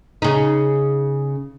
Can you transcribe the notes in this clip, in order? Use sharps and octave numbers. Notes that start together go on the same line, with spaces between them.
C#3 D#4